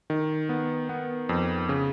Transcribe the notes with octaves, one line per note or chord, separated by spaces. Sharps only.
D#3
B3
B3
F2
C#3